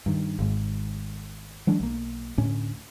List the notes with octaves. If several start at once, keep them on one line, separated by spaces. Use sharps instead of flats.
G2 D#3
G#1 G#2
E3 F#3 G#3 D4
B1 A#3
D2 A2 C#4